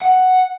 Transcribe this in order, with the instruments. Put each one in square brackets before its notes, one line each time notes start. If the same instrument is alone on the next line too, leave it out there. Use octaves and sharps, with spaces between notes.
[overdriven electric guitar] F#5